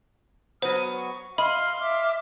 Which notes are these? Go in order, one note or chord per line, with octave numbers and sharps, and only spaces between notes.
F#3 B3 C5 D#6 F6
C#6
D#5 F5 B5 C6 F6
E5 D6 F6